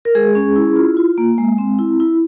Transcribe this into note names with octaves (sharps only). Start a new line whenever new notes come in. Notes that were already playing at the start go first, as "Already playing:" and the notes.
A#4
G#3 G#4
C#4
E4
F4
F4
A#3
G#3
C4
E4
E4